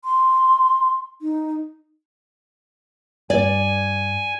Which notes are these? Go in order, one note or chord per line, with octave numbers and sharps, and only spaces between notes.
C6
D#4
G2 D5 G#5